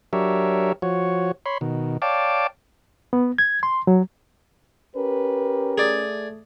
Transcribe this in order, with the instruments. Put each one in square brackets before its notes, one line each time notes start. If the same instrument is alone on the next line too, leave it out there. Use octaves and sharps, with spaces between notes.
[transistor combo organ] F#3 D4 G4 A#4 C#5 E5
F3 F#4 C#5
C#5 B5 C6
B2 D#3
C#5 D5 F5 G5 A5 D6
[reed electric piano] B3
G#6
C6
F#3
[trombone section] C#4 G4 A#4 [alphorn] B4
[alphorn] A3 [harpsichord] G#4 D5